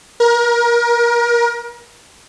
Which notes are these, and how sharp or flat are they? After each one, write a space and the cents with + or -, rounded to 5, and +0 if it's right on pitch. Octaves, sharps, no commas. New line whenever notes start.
A#4 +30